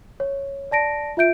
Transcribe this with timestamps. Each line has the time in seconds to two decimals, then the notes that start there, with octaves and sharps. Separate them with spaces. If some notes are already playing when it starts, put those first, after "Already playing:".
0.20 C#5
0.71 D5 A5 A#6 D7
1.17 F4 E5 G6 D7